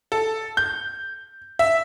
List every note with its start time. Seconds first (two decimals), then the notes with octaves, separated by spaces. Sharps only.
0.12 A4
0.57 G6
1.59 E5